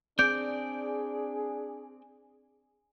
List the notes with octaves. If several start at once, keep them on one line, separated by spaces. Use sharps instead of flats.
C4 D4 G#4 D5 G6